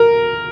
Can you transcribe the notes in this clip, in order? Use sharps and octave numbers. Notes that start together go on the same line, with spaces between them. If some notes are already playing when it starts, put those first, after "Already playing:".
Already playing: A#4